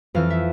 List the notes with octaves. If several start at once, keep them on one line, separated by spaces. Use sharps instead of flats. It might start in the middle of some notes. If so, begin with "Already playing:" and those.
F2 E3 F5
E5